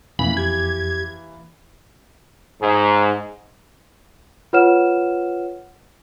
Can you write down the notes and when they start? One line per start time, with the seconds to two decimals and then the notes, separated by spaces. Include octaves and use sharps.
0.19 F2 E3 A#3 B5
0.37 G4 G#6
2.61 G#2
4.53 F4 B4 C#5 F#5 F6 E7